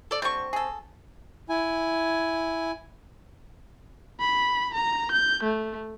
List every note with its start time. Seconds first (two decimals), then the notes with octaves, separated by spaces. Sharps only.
0.11 A4 D5
0.22 D3 G3 C4 C#6
0.53 G#4 A4
1.49 E4 G#5
4.20 B5
4.74 A#5
5.12 G6
5.43 A3